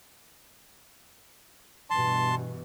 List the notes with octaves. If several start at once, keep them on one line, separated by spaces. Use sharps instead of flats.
G2 B2 E3 A5 C6